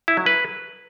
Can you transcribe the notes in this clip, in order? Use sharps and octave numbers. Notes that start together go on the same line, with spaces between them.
E4
F#3
B4